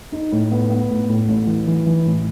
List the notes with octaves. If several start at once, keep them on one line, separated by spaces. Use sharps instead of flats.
D#4
A2
B3
B3
A2
A2
A1
E3
E3
E3
A1